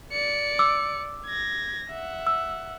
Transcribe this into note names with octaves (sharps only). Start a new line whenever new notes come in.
D5 C#7
D6 E6
G#6 A#6
E5 F#5
E6